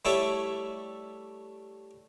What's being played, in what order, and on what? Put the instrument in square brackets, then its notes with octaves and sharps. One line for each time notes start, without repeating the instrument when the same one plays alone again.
[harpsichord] G3 A3 E4 A4 C#5 E5